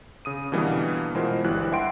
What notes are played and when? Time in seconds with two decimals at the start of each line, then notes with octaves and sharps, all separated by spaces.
0.25 C#3 D#6 D#7
0.52 B2 D3 E3 G3 A#3 B3
1.15 B2 E3 G#3 F4 A#4 C5
1.44 G1 E3 G3 F#6
1.72 E5 F#5 G5 B5 C6 D7